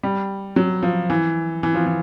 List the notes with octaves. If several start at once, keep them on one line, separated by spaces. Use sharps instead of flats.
G3
F#3
F3
E3
E3
F3
E3